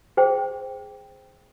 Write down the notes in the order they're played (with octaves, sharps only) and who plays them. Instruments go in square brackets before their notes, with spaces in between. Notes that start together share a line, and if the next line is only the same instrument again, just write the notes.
[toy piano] G#4 C5 G5